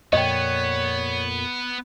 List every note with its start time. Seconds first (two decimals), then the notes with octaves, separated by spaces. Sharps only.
0.13 F2 A#2 B3 C#5 D#5 G5